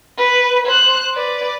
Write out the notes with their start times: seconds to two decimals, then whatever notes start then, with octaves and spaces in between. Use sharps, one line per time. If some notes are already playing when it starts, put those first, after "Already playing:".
0.19 B4
0.67 C5 F#6
1.15 B4 D5